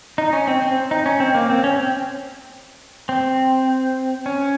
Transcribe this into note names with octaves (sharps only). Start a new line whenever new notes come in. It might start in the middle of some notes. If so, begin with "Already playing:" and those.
D#4
C#4
C4
C4
D#4
C#4
C4
A#3
C4
C#4
C4
C4
C#4